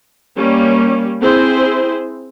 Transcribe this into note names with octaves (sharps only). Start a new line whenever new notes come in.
G3 A#3 C#4
C4 E4 G#4 C5